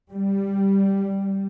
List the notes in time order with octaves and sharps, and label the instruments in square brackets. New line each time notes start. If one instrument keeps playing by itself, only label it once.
[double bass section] G3